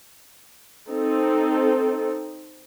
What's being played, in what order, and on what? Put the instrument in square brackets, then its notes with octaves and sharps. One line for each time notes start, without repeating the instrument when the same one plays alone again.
[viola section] C4 D#4 A4